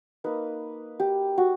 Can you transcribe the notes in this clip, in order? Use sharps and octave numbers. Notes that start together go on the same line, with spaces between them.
A#3 D#4 B4
G4
F#4